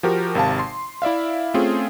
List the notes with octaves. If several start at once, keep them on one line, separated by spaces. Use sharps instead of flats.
F3 F#4 G4 A#4
G#1 C3 F5 A5
C6
E4 D5 E5 F5
A3 C4 C#4 F4 G#4